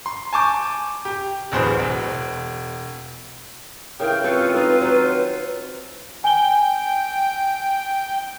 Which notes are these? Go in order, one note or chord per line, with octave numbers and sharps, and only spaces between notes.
C6
G#5 A5 C#6 D6 G6
G4
D1 A1 E2 G#4 B4 C5
E1
C#3 E3 A#4 G5
C4 F4 A4 B4 C#5
G#3
D#3 D#4
F#3 C5
G5 G#5 G7